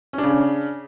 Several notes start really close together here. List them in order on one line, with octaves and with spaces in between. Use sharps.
C#4 D4 C#3